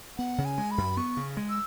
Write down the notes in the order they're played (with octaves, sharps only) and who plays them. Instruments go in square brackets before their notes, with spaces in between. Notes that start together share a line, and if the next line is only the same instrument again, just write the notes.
[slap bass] B3 [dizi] F#5
[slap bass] C#3
[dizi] G#5
[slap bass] G#3
[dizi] B5
[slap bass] F#2
[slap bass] B3 [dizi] C#6
[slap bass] C#3
G#3
[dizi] E6